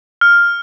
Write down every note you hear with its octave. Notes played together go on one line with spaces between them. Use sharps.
F6